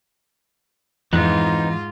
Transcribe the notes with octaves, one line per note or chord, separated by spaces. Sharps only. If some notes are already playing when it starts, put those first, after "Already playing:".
F2 G#2 E3 B3 C4 D#4 F4 F#6